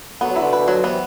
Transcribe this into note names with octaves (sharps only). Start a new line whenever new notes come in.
D3 F#3 B3
D3 F#3
E4
B2 D3
B4
F#3
C3 E3 B3